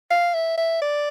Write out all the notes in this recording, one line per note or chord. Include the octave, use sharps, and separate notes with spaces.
F5
E5
E5
D5